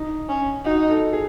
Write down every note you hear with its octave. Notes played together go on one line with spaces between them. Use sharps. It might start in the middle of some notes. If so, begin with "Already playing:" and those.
Already playing: D#4
C#4
D#4 F#4
A4
G#4